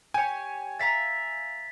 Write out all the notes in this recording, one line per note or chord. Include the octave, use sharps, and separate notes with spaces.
G4 C#5 G#5
E5 F5 A#5 A6 B6